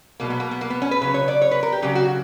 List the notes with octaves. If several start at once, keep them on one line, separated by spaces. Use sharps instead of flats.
B2 F#3 A#3
B3
A#3
B3
A#3
B3
C#4
B4
C#3 F#3 B4
C#5
D5
C#5
B4
A#4
G4
C#3 F#3 G4
F#4